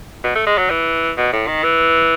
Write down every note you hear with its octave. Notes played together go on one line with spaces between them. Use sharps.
B2
A3
G#3
F#3
E3
B2
A2
D#3
E3